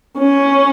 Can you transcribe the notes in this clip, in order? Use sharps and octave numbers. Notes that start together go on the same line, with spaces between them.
C#4